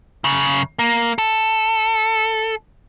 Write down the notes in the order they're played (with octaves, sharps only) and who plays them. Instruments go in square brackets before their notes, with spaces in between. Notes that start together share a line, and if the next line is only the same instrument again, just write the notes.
[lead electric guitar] F#2 C#3
A#3
A4